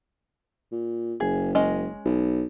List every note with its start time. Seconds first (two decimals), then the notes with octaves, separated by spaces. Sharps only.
0.71 A#2
1.20 F#1 G#4
1.55 G#3 C#4 D#5
2.05 B1